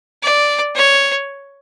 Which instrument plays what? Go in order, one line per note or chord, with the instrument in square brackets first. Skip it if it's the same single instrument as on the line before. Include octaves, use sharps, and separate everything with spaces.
[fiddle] D5
C#5